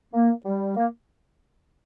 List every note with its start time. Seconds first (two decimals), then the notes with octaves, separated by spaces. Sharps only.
0.14 A#3
0.46 G3
0.77 A#3